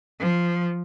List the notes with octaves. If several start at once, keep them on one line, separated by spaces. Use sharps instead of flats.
F3